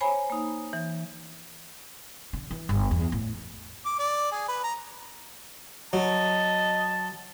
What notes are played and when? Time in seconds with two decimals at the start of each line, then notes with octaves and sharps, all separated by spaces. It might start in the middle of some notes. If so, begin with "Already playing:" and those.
0.01 C5 C#5 G#5 A#5 B5
0.30 A#3 D#4
0.73 E3
2.33 D3
2.51 E3
2.69 G1
2.91 E2
3.12 A2
3.85 D6
3.99 D5
4.32 G#4
4.48 B4
4.64 A#5
5.93 F#3 D#5 A5